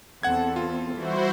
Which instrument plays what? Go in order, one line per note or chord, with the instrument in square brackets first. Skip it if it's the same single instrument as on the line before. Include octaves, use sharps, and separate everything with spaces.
[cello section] E2 C4 A4 [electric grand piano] F#5 G#6
[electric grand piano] F4
[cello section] E3 G3 [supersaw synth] E4 F#4 C5